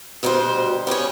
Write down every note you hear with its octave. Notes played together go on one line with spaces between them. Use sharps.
D2 B2 G3 A#4 C5
G3 B3 C#4 C#5